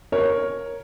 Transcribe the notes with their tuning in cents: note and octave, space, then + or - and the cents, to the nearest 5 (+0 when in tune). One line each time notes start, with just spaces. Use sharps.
A#4 +5 C#5 -5